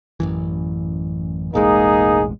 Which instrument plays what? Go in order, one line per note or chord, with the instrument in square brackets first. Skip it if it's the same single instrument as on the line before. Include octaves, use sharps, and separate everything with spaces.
[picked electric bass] A1 F#2 E3
[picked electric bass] E1 A1 G#3 [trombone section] A#3 D#4 G#4